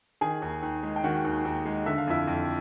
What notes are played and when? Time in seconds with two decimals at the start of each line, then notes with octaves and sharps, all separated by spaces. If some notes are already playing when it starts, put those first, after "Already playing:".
0.21 D#3 G#4 G#5
0.42 D#2
0.62 D#2
0.83 G#3
0.96 G5
1.04 D#3 F#4 F#5
1.24 D#2
1.45 D#2
1.65 G#3
1.86 D3 E5
1.98 F5
2.07 F2 E4 E5
2.27 F2